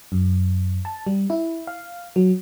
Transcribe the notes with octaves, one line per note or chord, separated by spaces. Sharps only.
F#2
A5
G3
E4
F5
F#3